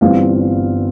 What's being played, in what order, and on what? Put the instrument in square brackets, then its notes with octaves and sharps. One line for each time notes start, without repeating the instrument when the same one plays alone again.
[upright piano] G1 G2 E3 G3 C4 F5